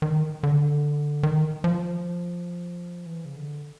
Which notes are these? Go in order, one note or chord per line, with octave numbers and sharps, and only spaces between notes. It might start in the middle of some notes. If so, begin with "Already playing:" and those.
D#3
D3
D#3
F3
E3
C#3
D3